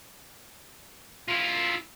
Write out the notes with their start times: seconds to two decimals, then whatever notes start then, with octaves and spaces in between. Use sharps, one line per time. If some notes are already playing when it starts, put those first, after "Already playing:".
1.28 E4 F4